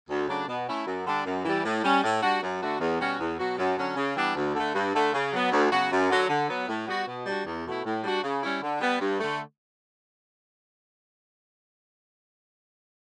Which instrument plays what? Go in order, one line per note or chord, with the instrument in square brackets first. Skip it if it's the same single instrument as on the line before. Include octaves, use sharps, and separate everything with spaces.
[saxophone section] D2
C#3 F#3 A3 D4
B2
A3 C#4 E4
F#2
D3 G3 D4
F#2
E3 G3
A2
G3 C#4
A2
G3 D4 F#4
F#2
D3 A3 D4 F#4
E2
B2 G3 C#4 F#4
E2
B2 F#3 B3 F#4
F#2
D3 F#3 C#4
C#3
E3 G3 B3 D4
D2
D3 A3
G2
D3 A3
C#3
F#3 B3
D2
C#3 F#3 B3 F#4
F#2
D3 F#3
D3
F#3 B3
A2
G3 B3 F#4
B2
G3 D4 F#4
E2
B2 A3 E4
A2
G3 D4 F#4
C#3
G3 C#4 E4
D3
G3 B3
G2
D3 A3